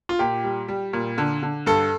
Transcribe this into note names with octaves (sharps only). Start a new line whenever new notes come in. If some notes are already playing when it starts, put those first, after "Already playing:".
F4
A#2 G4
G3
G3
A#2
D3
D3
G2 A4